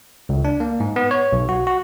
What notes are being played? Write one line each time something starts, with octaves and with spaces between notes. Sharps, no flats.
C#2
D4
A#3
G#2
B3
C#5
B1
F#4
F#4